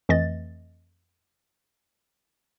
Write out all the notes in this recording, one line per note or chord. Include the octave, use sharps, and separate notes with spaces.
F2 E3 A3 D#5 A6